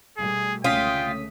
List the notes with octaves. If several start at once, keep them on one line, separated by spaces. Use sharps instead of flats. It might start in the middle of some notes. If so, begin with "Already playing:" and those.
B2 G3 A3 G#4
C#2 D3 A3 C#4 F4 G5 D#6 B6